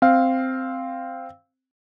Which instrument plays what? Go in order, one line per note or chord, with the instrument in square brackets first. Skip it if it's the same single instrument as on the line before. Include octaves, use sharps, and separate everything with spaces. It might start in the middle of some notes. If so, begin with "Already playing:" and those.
[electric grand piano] C4 F5